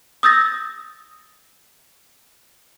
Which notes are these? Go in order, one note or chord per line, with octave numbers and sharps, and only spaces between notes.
D#6 E6 G6 A6 A#6